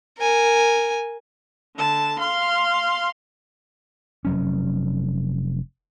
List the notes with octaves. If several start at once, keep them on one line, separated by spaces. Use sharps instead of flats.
A#4 G#5
D3 A5
F5 C6
F1 F#3 C#4